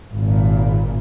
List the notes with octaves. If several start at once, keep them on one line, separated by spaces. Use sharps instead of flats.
G#1 A#2